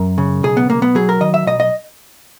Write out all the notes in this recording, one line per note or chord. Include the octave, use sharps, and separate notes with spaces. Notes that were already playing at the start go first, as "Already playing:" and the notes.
Already playing: F#2 A#4
C#3
B1 G#4
B3
B1 A#3
B3
F#3 G#4
A#4
D#3 D#5
E5
B1 D#5
D#5